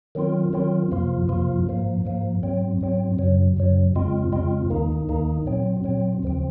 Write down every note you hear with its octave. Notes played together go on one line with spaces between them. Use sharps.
D#3 F#3 C4 F4
D#3 F#3 C4 F4
F2 C3 F3 A#3 F4
F2 C3 F3 A#3 F4
G#2 F3 A#3
G#2 F3 A#3
G#2 F#3 C4
G#2 F#3 C4
F#2 C#3 F#3
F#2 C#3 F#3
F2 C#3 G#3 C4 F4
F2 C#3 G#3 C4 F4
D#2 D#3 A#3 D#4
D#2 D#3 A#3 D#4
A#2 F#3 C4
A#2 F#3 C4
D#2 C#3 F3 C4